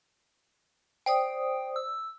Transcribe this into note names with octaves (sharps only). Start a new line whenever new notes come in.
C5 D5 G5 D#6
E6